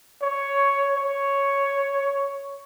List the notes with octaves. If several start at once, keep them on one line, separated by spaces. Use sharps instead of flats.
C#5
C#5